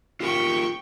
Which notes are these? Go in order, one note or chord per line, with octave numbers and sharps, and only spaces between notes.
F4 G4 A#4 G5 C#6